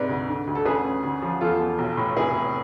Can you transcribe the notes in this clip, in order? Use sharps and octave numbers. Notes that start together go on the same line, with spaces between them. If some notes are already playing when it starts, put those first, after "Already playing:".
Already playing: G#2 C3 B4 D5
D2
D3
D2
A4
A1 G#4 B4
A1
D2
F3
E2 F4 A4
E2
B1
A2
F1 E4 G#4
F1